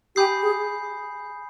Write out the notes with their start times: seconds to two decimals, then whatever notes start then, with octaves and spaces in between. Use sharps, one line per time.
0.16 G4 G#5 B5 D#6 G6 C7
0.43 G#4